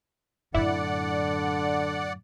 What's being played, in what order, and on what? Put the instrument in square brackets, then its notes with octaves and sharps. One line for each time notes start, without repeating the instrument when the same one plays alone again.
[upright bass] F#2 A2 [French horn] D3 [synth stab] E4 [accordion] D5 F#5